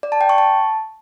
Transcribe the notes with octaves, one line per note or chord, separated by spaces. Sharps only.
D5
A5
G5
C#6
A5